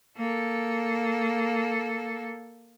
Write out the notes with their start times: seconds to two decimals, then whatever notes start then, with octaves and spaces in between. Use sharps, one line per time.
0.17 A#3 A4